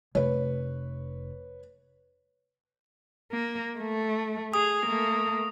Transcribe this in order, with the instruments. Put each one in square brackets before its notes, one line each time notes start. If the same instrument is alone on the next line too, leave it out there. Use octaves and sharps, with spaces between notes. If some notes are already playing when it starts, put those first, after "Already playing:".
[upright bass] F1 [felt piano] B4 C#5
[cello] A#3
A3
[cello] G#4 [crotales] D#6
[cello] A3 A#3